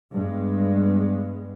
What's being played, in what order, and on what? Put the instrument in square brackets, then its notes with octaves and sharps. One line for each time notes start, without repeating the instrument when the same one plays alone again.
[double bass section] G2 G#3 B3